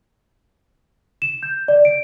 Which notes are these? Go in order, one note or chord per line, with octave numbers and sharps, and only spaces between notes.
E7
G6
D5
D7